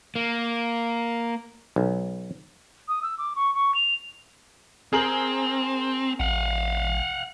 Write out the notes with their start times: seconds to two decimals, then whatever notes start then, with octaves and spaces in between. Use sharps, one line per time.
0.16 A#3
1.76 B1
2.88 D#6
3.03 E6
3.18 D6
3.36 C#6
3.54 C#6
3.75 F7
4.93 C4 G#4 A#4 F#7
6.20 A1 F5 F#5